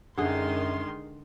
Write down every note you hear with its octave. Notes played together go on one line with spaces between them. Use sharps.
F#2 D3 D#3 G#3 G#4 C6